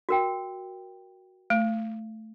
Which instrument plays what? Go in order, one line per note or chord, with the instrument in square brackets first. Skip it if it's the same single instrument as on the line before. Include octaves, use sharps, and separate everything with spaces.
[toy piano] F#4 A#4 G5
[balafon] A3